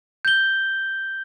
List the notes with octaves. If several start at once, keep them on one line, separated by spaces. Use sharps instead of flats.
G6 G7